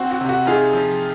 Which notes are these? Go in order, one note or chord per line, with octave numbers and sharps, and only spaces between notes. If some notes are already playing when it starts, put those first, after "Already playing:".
Already playing: C4 F#4
F#4
C3
F#4
D#4 F4 G#4
F3